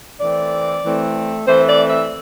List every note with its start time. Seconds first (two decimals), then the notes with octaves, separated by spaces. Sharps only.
0.20 E3 A3 C4 D5
0.84 E3 A3 C4
1.46 E3 A3 C4 C5
1.69 D5
1.89 E5